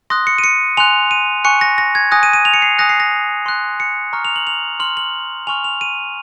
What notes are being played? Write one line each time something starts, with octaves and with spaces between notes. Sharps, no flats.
C6 D#6 F#6 A#6
C#7
D#7
C#7
G#5 C6 F#6 F7
D#7
G#5 C#6 F#6 C#7
A#6
A#6
G#6
G#5 D#6 F#6 A#6
D#7
D#7
F7
C#7
C7
G#5 D#6 F#6 A#6
C7
A#6
C6 F#6
C#7
A#5 C#6 F6
F7
F#7
F7
C6 F6 F#7
F#7
G#5 C#6 F6 F7
F7
D#7